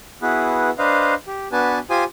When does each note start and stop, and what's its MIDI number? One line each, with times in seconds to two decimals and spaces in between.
0.22 0.70 59
0.22 0.70 64
0.22 0.70 66
0.22 0.70 68
0.22 0.70 71
0.78 1.14 62
0.78 1.14 71
0.78 1.14 72
0.78 1.14 75
0.78 1.14 77
1.27 1.48 67
1.52 1.79 59
1.52 1.79 62
1.52 1.79 66
1.52 1.79 71
1.52 1.79 80
1.52 1.79 81
1.90 2.04 65
1.90 2.04 67
1.90 2.04 72
1.90 2.04 80
1.90 2.04 87